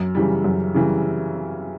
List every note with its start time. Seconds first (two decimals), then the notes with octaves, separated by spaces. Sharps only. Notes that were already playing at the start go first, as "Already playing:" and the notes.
Already playing: F#2
0.15 C#3 E3 G3
0.44 F#2
0.74 C#3 E3 G3